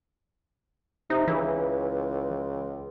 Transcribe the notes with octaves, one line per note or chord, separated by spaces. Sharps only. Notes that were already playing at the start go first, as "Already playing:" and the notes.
C3 D#4
C#2 E3